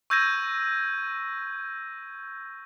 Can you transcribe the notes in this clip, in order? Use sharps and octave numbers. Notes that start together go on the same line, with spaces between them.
C#6 E6 G6 G#6 A#6 D#7